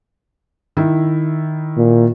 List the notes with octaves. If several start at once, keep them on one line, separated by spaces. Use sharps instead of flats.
D#3 E4
A#2